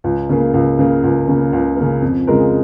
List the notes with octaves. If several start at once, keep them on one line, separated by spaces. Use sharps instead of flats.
C#2
C#3 A#3
C#2
C#3 A#3
C#2
C#3 A#3
C#2
C#3 A#3
F2
C#3 G#3 F4 A#4